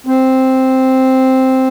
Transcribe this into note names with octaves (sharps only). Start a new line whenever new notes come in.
C4